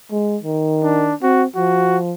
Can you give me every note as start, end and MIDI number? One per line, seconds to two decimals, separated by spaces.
0.11 0.37 56
0.43 1.12 51
0.84 1.14 62
1.22 1.46 60
1.22 1.43 66
1.56 2.14 53
1.56 1.98 66